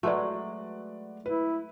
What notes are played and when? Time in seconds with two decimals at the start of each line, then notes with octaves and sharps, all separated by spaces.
0.03 F#3 G#3 A3 F#4 B4 D5
1.26 E4 B4